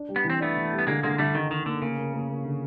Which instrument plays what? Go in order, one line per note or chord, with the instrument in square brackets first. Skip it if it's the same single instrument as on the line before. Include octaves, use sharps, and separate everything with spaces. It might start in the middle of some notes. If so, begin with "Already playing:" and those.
Already playing: [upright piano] D4
G3
[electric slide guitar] B3
[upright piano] E3
[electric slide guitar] C4
[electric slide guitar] A3 B3 [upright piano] D4
[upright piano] E3
G3
[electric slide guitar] B3
[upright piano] D3 [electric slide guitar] G#3 A#3
[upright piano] D3 [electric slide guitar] G#3 A#3
[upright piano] D3 [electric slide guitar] G3 A3
[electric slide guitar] D#3 [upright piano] D#4
[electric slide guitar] D#3 [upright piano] D#4
[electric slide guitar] D3 [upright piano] A#3
[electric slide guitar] C#3 [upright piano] A#3
[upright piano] A#3
A#3
A#3
D3